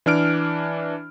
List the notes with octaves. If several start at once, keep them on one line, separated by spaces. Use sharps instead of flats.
E3 D4 F6 D7